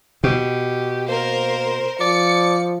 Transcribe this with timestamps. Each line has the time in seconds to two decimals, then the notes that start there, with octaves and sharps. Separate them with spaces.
0.24 B2 G4
1.08 A#3 A#4 C5
2.00 F3 D5 C#7